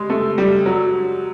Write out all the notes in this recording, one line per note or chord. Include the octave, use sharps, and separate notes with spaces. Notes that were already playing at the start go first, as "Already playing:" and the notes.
Already playing: G3 G#3
A3
G3
F#3